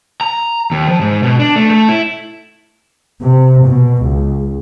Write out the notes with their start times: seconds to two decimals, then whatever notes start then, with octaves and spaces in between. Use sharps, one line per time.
0.21 A#5
0.72 D#2
0.88 F3
1.01 G#2
1.23 B2
1.39 D4
1.56 A3
1.71 A3
1.89 E4
3.21 C3
3.65 B2
4.04 C#2